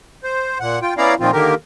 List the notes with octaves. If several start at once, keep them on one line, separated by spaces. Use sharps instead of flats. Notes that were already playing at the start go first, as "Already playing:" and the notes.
C5
A#2 F#5
F4 G5
B3 C#4 E4 D5 F5 A#5
A#2 D#3 F3 C4 F4
D3 D#3 A#3 G4 A#4